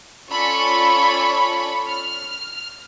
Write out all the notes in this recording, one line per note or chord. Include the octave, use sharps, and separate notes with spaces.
C#4 F4 A4 D5 B5 C#6
F6